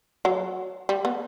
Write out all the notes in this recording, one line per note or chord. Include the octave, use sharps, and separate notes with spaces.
F#3
G3
B3